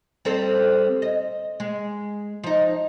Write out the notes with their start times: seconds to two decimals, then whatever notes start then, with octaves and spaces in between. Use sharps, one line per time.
0.25 G3 C4 A4
1.02 D#5
1.60 G#3
2.44 F3 D#4